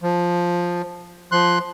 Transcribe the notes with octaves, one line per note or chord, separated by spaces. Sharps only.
F3
F3 C6 F#6